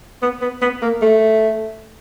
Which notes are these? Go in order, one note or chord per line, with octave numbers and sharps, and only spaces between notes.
B3
B3
B3
A#3
A3